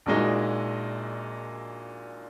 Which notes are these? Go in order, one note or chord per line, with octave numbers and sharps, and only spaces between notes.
A#1 A#2 G#3 D#4 F#4